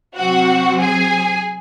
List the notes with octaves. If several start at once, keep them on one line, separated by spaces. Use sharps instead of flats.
C3 F#3 C4 F#4 F#5
G#4 G#5